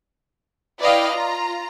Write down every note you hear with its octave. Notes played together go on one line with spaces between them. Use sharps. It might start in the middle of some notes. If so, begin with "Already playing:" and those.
E4 B4 D5 D#5 F5 G5
F4 A#5